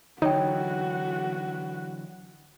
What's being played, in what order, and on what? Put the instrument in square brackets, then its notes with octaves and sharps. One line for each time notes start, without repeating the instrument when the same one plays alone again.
[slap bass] D3 E3 F#3 [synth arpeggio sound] D#4 [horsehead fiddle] F#4 [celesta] C#5 G5